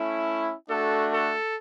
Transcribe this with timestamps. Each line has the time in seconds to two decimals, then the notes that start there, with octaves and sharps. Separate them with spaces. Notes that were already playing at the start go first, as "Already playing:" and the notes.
Already playing: A3 C#4 E4
0.69 A3 D4 F#4 A4
1.11 A4